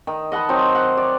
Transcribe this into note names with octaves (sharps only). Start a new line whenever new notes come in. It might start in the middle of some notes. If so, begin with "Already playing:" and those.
D#3
D#5 F#5 A5 B5
F#3 C4 D#4
F#5
D5